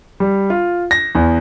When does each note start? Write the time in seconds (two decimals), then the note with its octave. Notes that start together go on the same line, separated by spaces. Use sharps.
0.20 G3
0.50 F4
0.91 A#6
1.15 E2